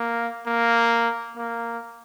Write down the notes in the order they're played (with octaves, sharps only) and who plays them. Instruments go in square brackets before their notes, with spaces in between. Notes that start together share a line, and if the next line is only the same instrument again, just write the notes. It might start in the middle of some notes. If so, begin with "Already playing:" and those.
Already playing: [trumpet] A#3
A#3
A#3